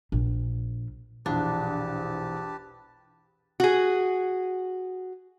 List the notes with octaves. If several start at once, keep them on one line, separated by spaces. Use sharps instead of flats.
A#1
E1 A#1 E2 D4 G4 B4 A5
F#4 G#4